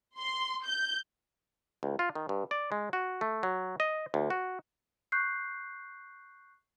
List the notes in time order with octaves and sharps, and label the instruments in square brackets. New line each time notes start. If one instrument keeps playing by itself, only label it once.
[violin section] C6
G6
[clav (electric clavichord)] C#2
F4
D#3
G2
D5
G#3
F#4
A3
F#3
D#5
D2
F#4
[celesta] C#6 F#6 G6 C7